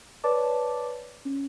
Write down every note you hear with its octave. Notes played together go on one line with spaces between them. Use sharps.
B4 C#5 D5 A5 D6
C#4